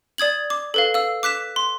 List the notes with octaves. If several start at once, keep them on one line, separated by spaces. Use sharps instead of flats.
D5 D#6 G#6 F#7
D6
A4 B4 F5
F5 E6
D6 F#6 B6 E7
C6